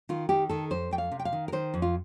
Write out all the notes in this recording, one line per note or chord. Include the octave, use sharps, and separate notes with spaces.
D#3 F4
D#3 G4
D#3 A4
F2 C5
F2 G5
F5
C3
G5
F5
D#3
A#4
D#3 C5
F2
F4